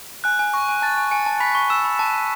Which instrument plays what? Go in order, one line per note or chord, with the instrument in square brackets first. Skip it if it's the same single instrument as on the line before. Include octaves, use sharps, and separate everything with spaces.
[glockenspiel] G#5 [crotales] F#6
[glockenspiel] G#5
[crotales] C#6
[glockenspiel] G#5
[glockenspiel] A5 [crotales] A6
[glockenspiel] G#5
[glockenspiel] G#5 [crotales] C#7
[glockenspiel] A5
[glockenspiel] B5 [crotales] B6
[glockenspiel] C#6
[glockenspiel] E6 [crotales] E7
[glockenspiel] B5
[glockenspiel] A5 [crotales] C#6